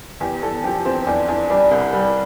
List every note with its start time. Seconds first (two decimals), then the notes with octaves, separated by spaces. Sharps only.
0.20 E2 G4
0.42 E2 A4
0.64 F3 G4
0.85 E2 C4
1.07 E2 D4
1.28 E2 D4
1.49 G3 D4
1.71 C2
1.93 G3